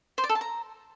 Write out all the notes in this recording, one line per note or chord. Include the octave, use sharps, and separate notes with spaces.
C5
D5
A4
A5
A#5